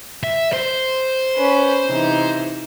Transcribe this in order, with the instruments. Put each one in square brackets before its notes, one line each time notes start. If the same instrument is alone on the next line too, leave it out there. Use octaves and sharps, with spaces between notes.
[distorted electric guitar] E5
C5
[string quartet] C#4 B4
C3 E3 D#4